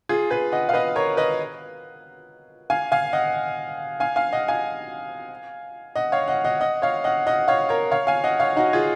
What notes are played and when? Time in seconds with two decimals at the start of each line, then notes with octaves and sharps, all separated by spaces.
0.09 F4 G#4
0.30 G#4 B4
0.52 D#5 F#5
0.69 F5
0.73 B4 D#5
0.96 A#4 C#5
1.17 B4 D#5
2.70 F5 G#5
2.92 F5 G#5
3.13 D#5 F#5
4.00 F5 G#5
4.16 F5 G#5
4.33 D#5 F#5
4.48 F5 G#5
5.95 D#5 F#5
6.12 C#5 F5
6.28 D#5 F#5
6.45 D#5 F#5
6.61 D#5 F#5
6.82 C#5 F5
7.04 D#5 F#5
7.27 D#5 F#5
7.48 C#5 F5
7.69 A#4 C#5
7.91 C#5 F5
8.07 F5 G#5
8.24 D#5 F#5
8.40 C#5 F5
8.56 D#4 F#4
8.73 F4 G#4